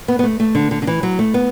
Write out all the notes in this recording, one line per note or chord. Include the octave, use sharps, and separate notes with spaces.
B3
B3
A3
A3
D3
D3
D3
E3
F#3
A3
B3